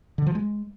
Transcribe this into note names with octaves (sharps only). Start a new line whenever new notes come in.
D3
F3
G#3